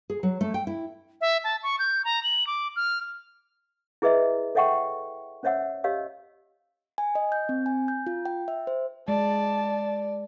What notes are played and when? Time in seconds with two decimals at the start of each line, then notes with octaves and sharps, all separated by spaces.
0.10 G#4
0.23 F#3
0.41 A3
0.54 G5
0.67 E4
1.21 E5
1.44 A5
1.63 C#6
1.79 G6
2.05 A#5
2.23 F#7
2.47 D6
2.76 F6
4.02 E4 G#4 B4 D#5 E5
4.55 A4 C#5 E5 F#5 G5 C#6
5.43 C#4 C5 C#5 E5 F#5 E6
5.84 G4 C#5 D#5 F5 E6
6.98 G#5
7.15 D#5
7.32 G6
7.49 C4
7.66 G#5
7.88 G6
8.07 F4
8.26 G5
8.48 E5
8.67 C5
9.08 G#3 D5 A5